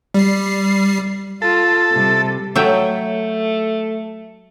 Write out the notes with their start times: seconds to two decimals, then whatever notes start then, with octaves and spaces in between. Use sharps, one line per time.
0.14 G3 C7
1.42 F4 A4
1.92 C3 G3
2.56 F#3 A3 E5 G5